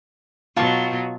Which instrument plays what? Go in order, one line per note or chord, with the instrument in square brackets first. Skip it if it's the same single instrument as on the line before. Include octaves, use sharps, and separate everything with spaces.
[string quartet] B2 F#3 [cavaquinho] F4 A5 C#6